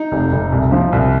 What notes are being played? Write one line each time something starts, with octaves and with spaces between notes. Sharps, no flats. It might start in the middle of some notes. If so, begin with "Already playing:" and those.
Already playing: D#4
F1
F1
C2
F3
C2